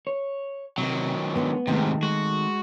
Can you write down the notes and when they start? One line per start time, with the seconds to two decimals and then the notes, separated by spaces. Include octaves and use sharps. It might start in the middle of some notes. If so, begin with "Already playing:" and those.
0.07 C#5
0.78 C3 D#3 F#3
1.36 G#3 B3 D4 C#5
1.67 G#2 C3 D#3 A3 C4
2.03 G#3 F#4